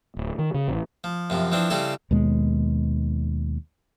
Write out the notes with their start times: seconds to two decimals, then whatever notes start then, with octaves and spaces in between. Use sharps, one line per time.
0.17 D1
0.38 D#3
0.54 C#3
0.68 A1
1.04 F3
1.30 F#2 C3 F3
1.52 E3 F3 C4 D4
1.70 C#3 G3 C4 E4 A4
2.11 D#2 B2 G#3